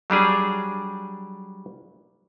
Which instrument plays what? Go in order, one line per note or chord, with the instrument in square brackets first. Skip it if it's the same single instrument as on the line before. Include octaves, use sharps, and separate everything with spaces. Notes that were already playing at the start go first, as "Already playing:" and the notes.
[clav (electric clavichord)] F#3 G3 D4 G#4